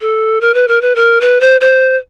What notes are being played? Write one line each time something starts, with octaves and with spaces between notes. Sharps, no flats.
A4
A#4
B4
A#4
B4
A#4
B4
C5
C5